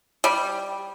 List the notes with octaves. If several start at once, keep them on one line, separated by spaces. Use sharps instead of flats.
G3